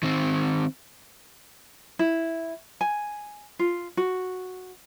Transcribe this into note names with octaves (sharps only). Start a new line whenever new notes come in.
D#3 C4
E4
G#5
F4
F#4